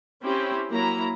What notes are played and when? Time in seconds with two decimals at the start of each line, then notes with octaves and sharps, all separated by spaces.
0.23 C4 C#4 E4 G4
0.69 F#3 A#3 E4 A#5